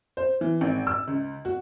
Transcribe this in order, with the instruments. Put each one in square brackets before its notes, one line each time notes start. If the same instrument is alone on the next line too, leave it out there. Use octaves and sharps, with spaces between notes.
[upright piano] C5
E3
G#1
E6
C#2
F#4